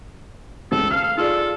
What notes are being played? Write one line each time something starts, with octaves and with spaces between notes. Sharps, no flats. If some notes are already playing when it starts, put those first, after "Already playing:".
C#2 A4
F5 F6
F4 G#4 A4 D5